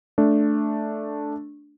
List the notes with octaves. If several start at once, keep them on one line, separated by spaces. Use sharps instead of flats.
A3 D4